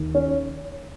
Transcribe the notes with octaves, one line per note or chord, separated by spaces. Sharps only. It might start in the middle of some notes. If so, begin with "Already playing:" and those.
Already playing: D#2
C#4